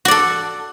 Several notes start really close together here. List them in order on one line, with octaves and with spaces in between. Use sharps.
F#4 D5 A4